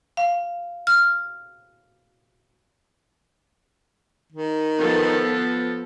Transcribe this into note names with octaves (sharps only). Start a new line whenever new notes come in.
F5
F6
D#3
F3 B3 A4